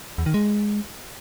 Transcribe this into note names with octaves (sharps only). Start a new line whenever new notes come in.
E2
D#3
G#3